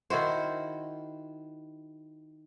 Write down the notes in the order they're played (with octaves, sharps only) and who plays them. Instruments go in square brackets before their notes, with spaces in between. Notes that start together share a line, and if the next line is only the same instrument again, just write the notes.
[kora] D#3 E4 F#4 C5